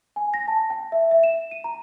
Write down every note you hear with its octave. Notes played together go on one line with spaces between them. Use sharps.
G#5
A#6
A5
G5
E5
E5
E7
D#7
A#5